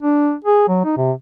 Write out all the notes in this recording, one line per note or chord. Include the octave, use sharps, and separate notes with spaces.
D4
G#4
F#3
D#4
C3